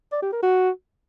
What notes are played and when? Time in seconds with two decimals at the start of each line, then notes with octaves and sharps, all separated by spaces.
0.12 D5
0.22 G4
0.32 A#4
0.42 F#4